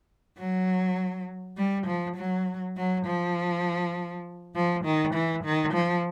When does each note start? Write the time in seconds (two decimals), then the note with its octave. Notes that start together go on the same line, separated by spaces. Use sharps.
0.38 F#3
1.57 G3
1.87 F3
2.16 F#3
2.77 F#3
3.06 F3
4.55 F3
4.84 D#3
5.14 E3
5.44 D#3
5.73 F3